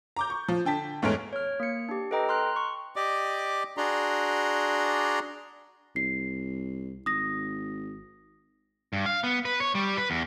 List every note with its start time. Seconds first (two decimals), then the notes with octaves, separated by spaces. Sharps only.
0.16 A#5 D6 G6
0.30 C#6
0.48 F3
0.65 D3 G5 A5 B6
1.02 E2 G#2 A3 C#5 F6 D7
1.33 C#5 F6
1.60 A#3 C#7
1.89 D4 G4
2.11 A4 B4 D#5 G5 A#5
2.29 A#5 C6 F6 F#6
2.56 C#6
2.96 G4 D5 D#5 D6
3.77 D4 F#4 G#4 D5 A#5 C6
5.96 C2 C7
7.06 G#1 D#6 A#6
8.93 G2
9.06 F5
9.24 B3
9.45 B4
9.60 C#5
9.75 G3
9.97 B4
10.10 E2